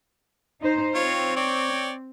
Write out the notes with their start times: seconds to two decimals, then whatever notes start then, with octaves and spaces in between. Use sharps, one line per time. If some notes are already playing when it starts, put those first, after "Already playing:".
0.61 D#4 C5
0.95 C4 F4 C#5
1.36 C#5 D5 G5